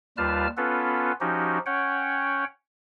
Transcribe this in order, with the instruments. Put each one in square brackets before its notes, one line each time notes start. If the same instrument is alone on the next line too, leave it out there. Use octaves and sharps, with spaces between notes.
[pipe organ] D#2 G3 F4 B4 A5 F6
B3 C#4 F4 A4 B4
F3 C#4 D#4 F#4 G4
C#4 C#5 F#5 G5